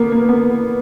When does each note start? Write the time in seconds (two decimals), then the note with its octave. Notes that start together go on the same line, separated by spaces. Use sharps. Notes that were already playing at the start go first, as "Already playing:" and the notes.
Already playing: A#3 B3
0.12 A#3
0.29 B3